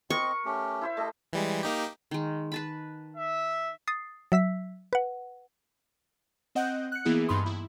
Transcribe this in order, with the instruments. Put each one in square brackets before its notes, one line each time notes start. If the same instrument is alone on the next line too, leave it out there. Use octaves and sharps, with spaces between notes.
[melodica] C4 D#5 [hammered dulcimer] A#4 [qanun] C#6
[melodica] A3 C#4 G4
[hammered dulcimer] E4 C5 E5
[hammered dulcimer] A3 G4 [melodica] A4 D#5
[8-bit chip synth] E3 G3 G#3
A#3 D#4 G4
[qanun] D#3 G#3
B4 A5 B5
[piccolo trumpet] E5
[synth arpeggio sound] D#6 A6 C7
F#3 E5 E6 B6
B4 F#5
[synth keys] C4 D#5 F#5 F#6 G6
F#6 C#7
E3 A#3 B3 E4 G#4
G2 D#4 B5 C6 D#6
E4